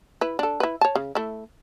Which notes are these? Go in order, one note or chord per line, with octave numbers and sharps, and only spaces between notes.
E4 B4
D4 A4
E4 B4
C#5 A5
C#3
A3 E4